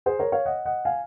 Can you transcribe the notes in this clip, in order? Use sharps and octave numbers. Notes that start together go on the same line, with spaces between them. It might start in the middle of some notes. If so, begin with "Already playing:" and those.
G#4 C5
A#4 C#5
C#5 F5
D#5 F#5
D#5 F#5
F5 G#5